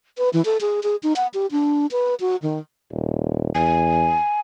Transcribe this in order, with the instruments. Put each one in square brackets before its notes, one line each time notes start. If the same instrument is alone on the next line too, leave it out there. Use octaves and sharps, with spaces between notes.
[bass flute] B4
E3
A4
G#4
G#4
D#4
F#5
G4
D4
B4
F#4
D#3
[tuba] D#1
[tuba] E2 [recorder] G#5